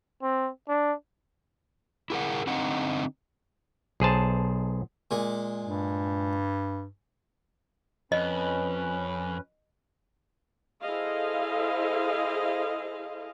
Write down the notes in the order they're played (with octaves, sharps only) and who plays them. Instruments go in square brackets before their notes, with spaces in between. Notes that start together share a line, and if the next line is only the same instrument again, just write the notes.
[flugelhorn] C4
D4
[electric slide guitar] E4 G#4 A#4 F#5
D3 C4 D#4 F#5
[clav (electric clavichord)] B1 G#4 C5 A5
[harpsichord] A#2 G#3
[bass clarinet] G2
[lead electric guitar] F2 [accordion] C#4 B4 [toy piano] D#5
[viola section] E4 G#4 A4 C5 D#5 F5